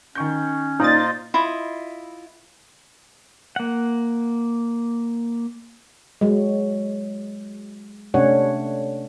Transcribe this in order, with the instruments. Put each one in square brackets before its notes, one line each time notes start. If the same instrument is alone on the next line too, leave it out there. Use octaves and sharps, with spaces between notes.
[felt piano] D#3 C#6 G6 [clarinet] C#4
[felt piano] A#2 D5 D#6 [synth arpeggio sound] D#4 A6 [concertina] F4 C5 D#5
[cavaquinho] E4 F4 D#5
[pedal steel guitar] A#3 F#5
[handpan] F#3 G#3
C3 A3 C#4 D4 C#5 F#5